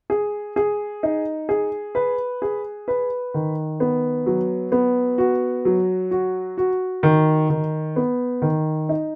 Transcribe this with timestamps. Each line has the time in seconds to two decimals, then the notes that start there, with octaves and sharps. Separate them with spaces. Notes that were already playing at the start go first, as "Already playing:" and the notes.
0.10 G#4
0.56 G#4
1.03 D#4
1.49 G#4
1.95 B4
2.42 G#4
2.88 B4
3.34 D#3
3.80 B3
4.26 F#3
4.72 B3
5.18 F#4
5.65 F#3
6.11 F#4
6.58 F#4
7.03 D#3
7.50 D#3
7.96 B3
8.42 D#3
8.89 D#4